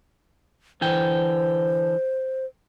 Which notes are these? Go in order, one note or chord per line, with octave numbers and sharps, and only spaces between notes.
D3 E3 C5 G5